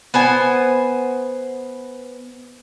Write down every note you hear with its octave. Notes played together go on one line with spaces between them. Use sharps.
B3 C5 G#5